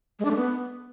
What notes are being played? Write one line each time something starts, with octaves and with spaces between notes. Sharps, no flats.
G#3
D4
A3
B3